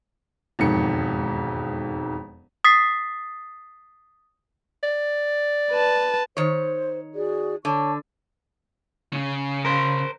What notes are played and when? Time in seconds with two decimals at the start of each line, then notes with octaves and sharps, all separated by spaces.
0.59 E1 F2 G#2 D#3 C#7
2.65 D#6 A6 B6 C7
4.83 D5
5.70 B4 A5
6.37 D#3 C5 C#5
7.14 F#4 G#4 D5
7.65 D3 C#5 A5 C#6
9.13 C#3
9.65 A#4 C5